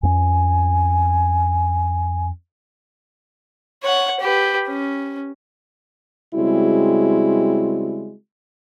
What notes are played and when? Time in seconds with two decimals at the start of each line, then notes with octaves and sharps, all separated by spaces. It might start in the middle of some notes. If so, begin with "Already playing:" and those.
0.03 F2 B3 C#4 G#5
3.83 C#5 F#5
4.20 G4 B4
4.68 C#4
6.35 C#3 G3 G#3 C4 E4 F#4